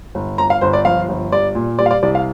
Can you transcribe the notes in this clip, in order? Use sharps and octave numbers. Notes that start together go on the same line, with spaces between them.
G1
G1 A#5
F5
G1 C5
D5
F3 F5
G1
G3 D5
A#2
G3 D5
F5
D5
C2 D5
F5